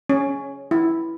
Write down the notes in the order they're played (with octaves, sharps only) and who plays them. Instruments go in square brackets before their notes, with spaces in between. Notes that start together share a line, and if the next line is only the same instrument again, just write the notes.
[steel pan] C#4
E4